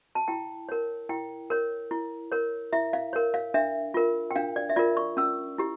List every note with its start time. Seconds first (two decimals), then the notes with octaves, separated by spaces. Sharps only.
0.15 A5
0.28 E4 G5
0.69 A#4 C#5
1.09 E4 G5
1.50 A#4 C#5
1.91 E4
2.32 A#4 C#5
2.73 E4 E5
2.93 F5
3.13 A#4 C#5
3.34 F5
3.54 D4 E5
3.94 F4 A#4
4.31 G5
4.36 D4 F5
4.56 D5
4.69 E5
4.76 F4 A#4 D5
4.97 C#6
5.17 C#4 E6
5.58 E4 G4